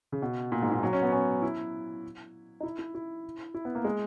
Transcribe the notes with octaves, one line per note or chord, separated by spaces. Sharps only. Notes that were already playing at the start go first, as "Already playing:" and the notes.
C#3
B2
A#2
G#2
A#2
F#3
C#4
B3
C#4
E4
D#4
E4
E4
E4
E4
B3
A#3
G#3